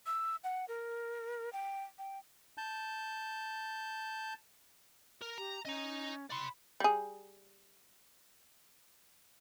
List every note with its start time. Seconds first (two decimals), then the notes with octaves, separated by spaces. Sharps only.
0.06 E6
0.44 F#5
0.68 A#4
1.53 G5
1.99 G5
2.58 A5 G6
5.21 A#4
5.38 G4 A#5
5.65 C#4 D#5 A#5
6.30 D5 B5 C6
6.80 G3 G#4